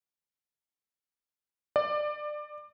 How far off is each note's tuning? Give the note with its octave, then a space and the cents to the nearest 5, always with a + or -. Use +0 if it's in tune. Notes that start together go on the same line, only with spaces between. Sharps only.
D5 +25